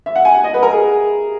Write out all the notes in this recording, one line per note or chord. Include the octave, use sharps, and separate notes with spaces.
E5
F#5
G#5
F#5
D#5
B4
A#4
G#4